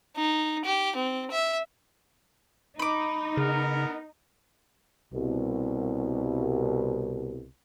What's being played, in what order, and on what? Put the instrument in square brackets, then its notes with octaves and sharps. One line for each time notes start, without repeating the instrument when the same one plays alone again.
[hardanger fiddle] D#4
G4
C4
E5
[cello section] D#4 [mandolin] B5 D6
[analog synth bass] C#3 [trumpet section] B3 A#4
[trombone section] C2 B2